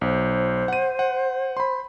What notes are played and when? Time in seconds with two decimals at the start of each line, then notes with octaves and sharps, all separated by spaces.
0.01 B1 C5
0.68 F#5 D#7
0.99 F#5
1.57 B5 C6